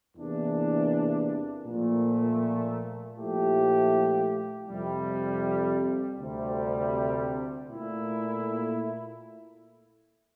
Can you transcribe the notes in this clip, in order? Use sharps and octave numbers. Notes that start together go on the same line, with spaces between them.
E2 C3 E3 A#3 D4
A#2 F3 A3
A#2 F3 A3 E4 G4
F2 C3 G3
D2 C3 G3
A#2 A3 E4